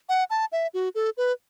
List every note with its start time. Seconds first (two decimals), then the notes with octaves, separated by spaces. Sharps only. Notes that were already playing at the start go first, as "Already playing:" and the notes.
0.09 F#5
0.30 A5
0.52 E5
0.74 F#4
0.95 A4
1.17 B4